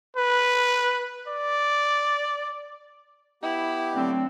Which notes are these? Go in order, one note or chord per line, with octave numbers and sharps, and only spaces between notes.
B4
D5
B3 E4 G4
D3 F#3 A3 C4